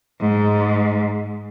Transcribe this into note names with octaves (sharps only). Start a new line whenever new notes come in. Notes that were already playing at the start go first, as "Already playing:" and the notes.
G#2